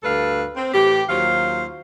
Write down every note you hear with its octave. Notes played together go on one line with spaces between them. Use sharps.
D2 G2 A4 B4 F5
C4
A2 E3 G4
D#2 F#3 F4 C5 F5